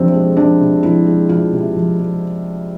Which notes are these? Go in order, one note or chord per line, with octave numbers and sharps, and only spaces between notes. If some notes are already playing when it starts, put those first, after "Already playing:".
Already playing: F2 C3 F3 C4 D4
G#3
F3 D4
C3
F2 E4
G#3
F3 F4
C3
F2
G#3